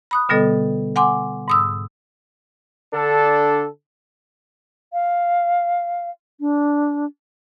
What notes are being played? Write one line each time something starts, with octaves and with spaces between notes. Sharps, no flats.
B5 D#6 F#6
B2 D3 G3 B3 A4 D#5
F#5 G#5 C6 D6
G#2 D#6 E6
D3 D4 A4
F5
D4